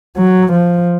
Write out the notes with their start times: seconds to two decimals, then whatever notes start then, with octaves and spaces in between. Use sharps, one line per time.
0.17 F#3
0.53 F3